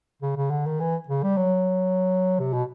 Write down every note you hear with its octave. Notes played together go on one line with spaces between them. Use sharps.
C#3
C#3
D3
D#3
E3
C#3
G3
F#3
C3
B2